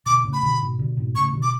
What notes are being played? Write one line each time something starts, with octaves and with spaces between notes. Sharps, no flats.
B2 D3 D6
A2 C#3
B5
B2 D3
G#2 B2
B2 D3
G#2 B2
A2 C#3 C#6
B2 D3
D6